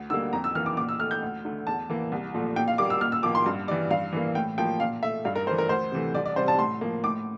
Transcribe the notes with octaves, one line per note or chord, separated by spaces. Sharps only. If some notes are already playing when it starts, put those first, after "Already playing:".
Already playing: D2
D3 G3 A#3 E6
F2 A#5
E6
E3 A#3 F6
D6
A#2 D6
E6
A3 F6
G6
D2
D3 A3
E2 A5
E3 A#3
C2
A#2 F3 A3
A#2 G5
F5
G3 A#3 D6
E6
A#2 F6
E6
F3 A#3 D6
C6
G2
E3 G3 D5
G2 F5
E3 A#3
A2 G5
F3 A#3 G5
A#2 F5
A3 E5
G2 F5
A#4
E3 A3 C5
A#4
D2 C5
C3 E3 A3
C2 D5
D5
C3 G3 C5
A5
A2 C6
F3 A#3
A2 D6